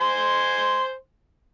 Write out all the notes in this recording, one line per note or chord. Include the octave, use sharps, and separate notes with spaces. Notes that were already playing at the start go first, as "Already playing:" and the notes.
C5 G#5 C6